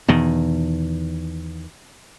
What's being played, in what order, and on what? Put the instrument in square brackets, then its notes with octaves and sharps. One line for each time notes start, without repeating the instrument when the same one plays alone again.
[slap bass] E2 B2 D#3